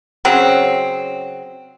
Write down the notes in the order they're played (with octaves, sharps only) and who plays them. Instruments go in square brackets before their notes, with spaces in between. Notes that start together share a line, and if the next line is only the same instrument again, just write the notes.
[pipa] C#3 F#3 C4